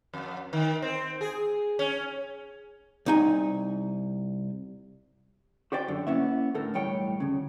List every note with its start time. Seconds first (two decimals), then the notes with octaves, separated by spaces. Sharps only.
0.14 F2
0.53 D#3
0.82 C4
1.21 G#4
1.79 C#4
3.06 C2 D#4 G#5
5.72 F#4 G4 C5 D5 G5
5.88 F#2 D3
6.07 A#3 B3 C#4 E4 E5
6.55 A2 D3 A4 A#4
6.74 B1 E2 A2 G3 C#5 G5
7.20 D2 C#3